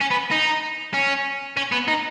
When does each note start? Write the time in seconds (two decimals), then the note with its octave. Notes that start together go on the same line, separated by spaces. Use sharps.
0.01 C#4
0.11 B3
0.32 D#4
0.94 C#4
1.57 C#4
1.72 B3
1.88 D#4